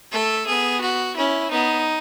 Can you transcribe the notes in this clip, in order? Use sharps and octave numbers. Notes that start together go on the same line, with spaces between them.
A3 A4
B3 G#4
F#4
C#4 E4
B3 D#4